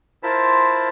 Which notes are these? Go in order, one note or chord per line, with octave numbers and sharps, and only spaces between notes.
E4 F4 A#4 C5 A5 B5